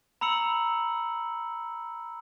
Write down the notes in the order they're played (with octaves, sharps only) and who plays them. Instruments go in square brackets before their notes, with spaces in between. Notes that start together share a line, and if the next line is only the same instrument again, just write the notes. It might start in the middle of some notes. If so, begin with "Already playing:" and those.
[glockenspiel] A#5 B5 E6 C#7 F#7